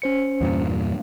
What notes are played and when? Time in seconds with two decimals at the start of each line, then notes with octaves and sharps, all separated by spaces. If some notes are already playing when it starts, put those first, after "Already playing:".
0.02 C#4 C5 C#7
0.41 E2 G2 A#2